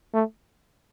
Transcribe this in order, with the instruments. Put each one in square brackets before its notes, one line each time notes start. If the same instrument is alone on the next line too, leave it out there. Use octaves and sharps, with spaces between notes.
[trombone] A3